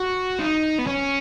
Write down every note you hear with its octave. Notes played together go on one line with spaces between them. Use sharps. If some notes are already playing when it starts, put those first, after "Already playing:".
Already playing: F#4
D#4
B3
C#4